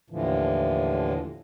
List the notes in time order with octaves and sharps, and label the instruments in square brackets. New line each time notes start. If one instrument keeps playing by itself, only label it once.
[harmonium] D#2 A2 D3 E3 F3